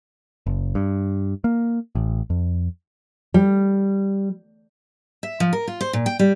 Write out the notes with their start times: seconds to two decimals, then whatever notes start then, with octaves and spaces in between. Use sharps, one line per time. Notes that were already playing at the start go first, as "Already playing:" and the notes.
0.46 F#1
0.75 G2
1.44 A#3
1.95 A1
2.30 F2
3.34 G3
5.23 E5
5.40 F3
5.53 A#4
5.68 F4
5.81 C5
5.93 A#2
6.06 G5
6.19 G3